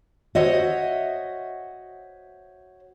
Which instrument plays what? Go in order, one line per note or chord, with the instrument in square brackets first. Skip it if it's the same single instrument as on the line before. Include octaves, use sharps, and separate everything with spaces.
[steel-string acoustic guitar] F#4 C5 C#5 D#5 E5 F#5